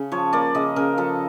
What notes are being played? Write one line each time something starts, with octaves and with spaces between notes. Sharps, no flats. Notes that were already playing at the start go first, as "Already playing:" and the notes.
Already playing: C#3
F3 C#5
A#3 D5
C#3 D#5
C#3 A#4
F3 A4